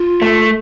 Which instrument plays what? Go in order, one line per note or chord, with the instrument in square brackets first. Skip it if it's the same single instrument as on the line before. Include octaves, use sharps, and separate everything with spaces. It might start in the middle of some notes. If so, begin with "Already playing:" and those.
Already playing: [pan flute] F4
[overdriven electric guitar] A3